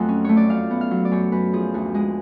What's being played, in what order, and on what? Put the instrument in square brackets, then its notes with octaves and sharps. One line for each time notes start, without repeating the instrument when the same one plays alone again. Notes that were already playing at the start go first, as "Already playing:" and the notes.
Already playing: [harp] F2 F#3 A3 F#5 G#5
C#4
A3 C#5
D5
F#2 F5
B3
F5
F#3
D5
F#2 C#5
F#2 B4
F3 G#4
D2 F#4
G#3 G#4